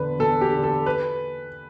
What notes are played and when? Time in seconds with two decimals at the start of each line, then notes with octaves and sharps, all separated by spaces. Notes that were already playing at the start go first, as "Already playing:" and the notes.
Already playing: E2 D3 B4
0.19 E2 A4
0.41 G4
0.52 D3
0.63 A4
0.86 B4